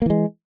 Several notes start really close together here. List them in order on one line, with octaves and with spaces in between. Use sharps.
A#3 E3 G#3